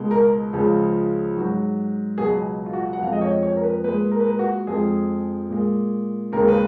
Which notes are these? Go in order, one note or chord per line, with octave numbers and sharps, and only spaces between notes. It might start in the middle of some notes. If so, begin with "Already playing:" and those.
Already playing: C#2 B2 G#3
A#4
C#2 C#3 F3 G#3
G#2 F#3
C#2 B2 F#3 G#4
F4
F#4
F#5
F2 F3 G#3 F5
D#5
C#5
C#5
A#4
B4
A#2 G#3 B4
A#4
B4
A#4
F#4
F2 F3 G#3 G#4
A#2 G#3
D#2 C#3 G#3 A#4
B4